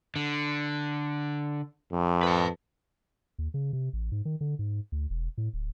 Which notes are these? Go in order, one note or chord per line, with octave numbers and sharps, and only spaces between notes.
D3
F2
B4 A5
D#2
C#3
C3
A1
G#2
D#3
D3
G#2
D2
E1
A2
D1